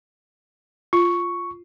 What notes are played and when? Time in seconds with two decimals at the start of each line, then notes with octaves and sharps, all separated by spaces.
0.93 F4 C#6